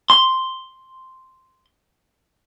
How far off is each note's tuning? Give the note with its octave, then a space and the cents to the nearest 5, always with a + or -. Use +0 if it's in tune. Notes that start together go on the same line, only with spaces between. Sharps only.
C6 +0